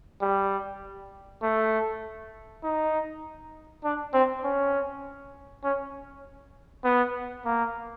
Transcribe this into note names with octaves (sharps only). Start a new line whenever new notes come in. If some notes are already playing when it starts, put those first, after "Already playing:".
G3
A3
D#4
D4
C4
C#4
C#4
B3
A#3